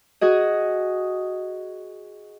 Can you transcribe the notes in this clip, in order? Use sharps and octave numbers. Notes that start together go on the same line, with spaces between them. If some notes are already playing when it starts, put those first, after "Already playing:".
F#4 G#4 D#5